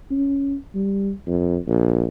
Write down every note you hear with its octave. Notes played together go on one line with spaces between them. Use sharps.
C#4
G3
F2
A#1